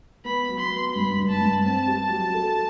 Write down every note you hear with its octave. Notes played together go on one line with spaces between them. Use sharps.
B3 B5
F#3
C6
B3
G2 B5
G2
A5
G2
C4 A5
G4
F#3
A4